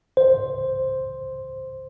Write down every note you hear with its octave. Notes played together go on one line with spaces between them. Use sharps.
C5